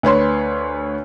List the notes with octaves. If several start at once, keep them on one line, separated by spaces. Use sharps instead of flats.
D2 B4 C#5 C6